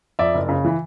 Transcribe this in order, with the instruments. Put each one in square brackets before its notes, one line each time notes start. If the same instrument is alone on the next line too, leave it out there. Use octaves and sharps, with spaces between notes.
[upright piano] F2 D5 E5
F#1
C#3
E3